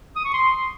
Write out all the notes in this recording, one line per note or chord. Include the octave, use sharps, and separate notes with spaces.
D#6
C#6
C6